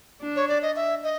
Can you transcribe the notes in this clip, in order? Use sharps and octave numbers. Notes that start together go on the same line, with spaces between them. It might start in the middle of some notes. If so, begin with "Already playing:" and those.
D4
C#5
D5
D#5
E5
D#5